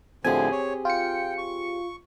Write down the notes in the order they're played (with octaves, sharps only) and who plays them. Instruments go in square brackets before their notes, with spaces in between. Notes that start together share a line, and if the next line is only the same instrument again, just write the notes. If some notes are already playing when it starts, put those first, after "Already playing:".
[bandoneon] A2 D3 F3 [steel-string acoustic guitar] C4 G4 G#4 [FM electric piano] G#5
[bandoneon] C#5
[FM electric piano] F4 C#7 [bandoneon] G5
[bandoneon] C#6